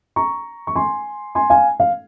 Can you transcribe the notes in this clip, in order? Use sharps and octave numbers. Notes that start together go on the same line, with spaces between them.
A#5 C#6
C#6
G#5 C6
G#5 C6
F5 G#5
F5